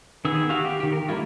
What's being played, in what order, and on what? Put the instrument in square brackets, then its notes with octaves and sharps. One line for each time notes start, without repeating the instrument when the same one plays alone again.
[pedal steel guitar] D#3 B3 G#4 E6
F#4 G4 F5
G4
D#3 G4
A#4
G3 A3 E4 F4